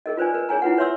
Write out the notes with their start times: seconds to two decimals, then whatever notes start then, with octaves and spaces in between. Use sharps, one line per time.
0.06 G#4 A#4 D#5
0.17 F4 B4 C5 D5 G#5
0.34 A#4 B4
0.49 G#4 C#5 G#5 A#5
0.62 E4 F4 B4 F#5
0.77 B4 C#5 E5 C6 C#6 E6